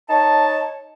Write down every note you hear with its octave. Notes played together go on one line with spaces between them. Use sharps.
D#4 C#5 A5